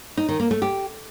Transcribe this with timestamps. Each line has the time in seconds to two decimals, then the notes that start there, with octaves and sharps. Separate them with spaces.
0.17 D#4
0.29 D#3
0.40 A#3
0.51 A3
0.62 G4